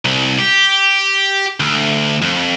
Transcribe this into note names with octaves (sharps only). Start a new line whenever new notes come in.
C2
G4
D2
F2